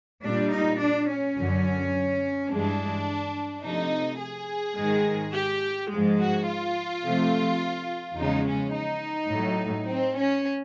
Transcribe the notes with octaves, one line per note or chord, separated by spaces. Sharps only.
A#2 G3 D4
D#4
D4
C#4
F#2 D3 F#3
G2 E3 G#3 D4
C3 F3 A3 D#4
G#4
G#2 D#3 G#3
G4
G#2 F3 G#3
F#4
F4
C3 F3 A3
E2 C#3 F3 G#3 D#4
C#4
D#4
A2 F#3 A3
C4
C#4